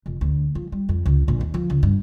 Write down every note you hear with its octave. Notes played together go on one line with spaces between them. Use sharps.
F1
D2
F3
G3
F2
C#2
A#1
D#2
F3
C#2
G2